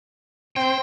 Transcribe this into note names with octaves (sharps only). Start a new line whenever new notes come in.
C4 C5 G5